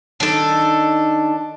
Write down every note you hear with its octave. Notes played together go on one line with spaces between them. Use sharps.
D#3 D4 D#4 A4 C#5